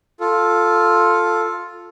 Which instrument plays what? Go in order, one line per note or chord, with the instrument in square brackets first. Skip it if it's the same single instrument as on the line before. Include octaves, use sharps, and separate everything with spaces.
[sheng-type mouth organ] F4 A4